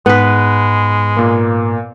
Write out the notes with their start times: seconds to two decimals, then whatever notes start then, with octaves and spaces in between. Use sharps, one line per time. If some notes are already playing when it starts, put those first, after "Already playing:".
0.06 G#2 G#3 B3 B4
1.17 A#2 A#3